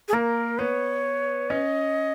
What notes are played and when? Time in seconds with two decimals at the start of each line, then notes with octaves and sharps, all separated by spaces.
0.08 G#4
0.13 A#3 A#4
0.59 B3 C#5
1.50 C#4 D#5